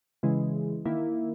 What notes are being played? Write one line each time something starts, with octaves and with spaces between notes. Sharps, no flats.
C#3 E3 G#3
D#3 A#3 E4